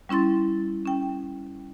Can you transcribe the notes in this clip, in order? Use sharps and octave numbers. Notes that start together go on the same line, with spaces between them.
G3 C#4 E4 C6 A6
C#4 G5